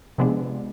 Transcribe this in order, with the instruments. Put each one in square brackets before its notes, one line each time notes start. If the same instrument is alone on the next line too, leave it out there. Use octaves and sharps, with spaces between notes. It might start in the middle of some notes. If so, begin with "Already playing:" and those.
[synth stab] C3 F3 G#3 B3 D4